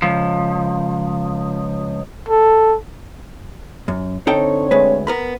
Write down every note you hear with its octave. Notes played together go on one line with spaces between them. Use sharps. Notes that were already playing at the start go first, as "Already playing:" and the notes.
C#2 F3
A4
F#2
D3 C4 D#4 A4 C#5 G5
D2 G#3 B4
B3 A#4 B5